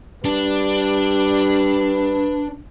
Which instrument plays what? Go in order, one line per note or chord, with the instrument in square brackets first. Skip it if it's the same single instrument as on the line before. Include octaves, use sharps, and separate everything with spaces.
[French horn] G3 [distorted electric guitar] D4 [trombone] B4